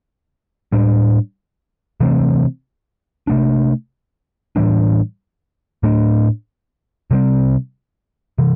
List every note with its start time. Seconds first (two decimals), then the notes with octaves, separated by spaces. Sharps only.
0.72 A2 G3 D4
2.00 C3 E3 A3 C4
3.27 C3 A3 D4
4.56 A2 E3 G3 D4
5.83 A2 A3 D4
7.11 C3 G3 C4
8.38 C3 E3